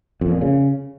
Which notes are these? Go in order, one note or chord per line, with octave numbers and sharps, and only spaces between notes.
F2
A#2
C#3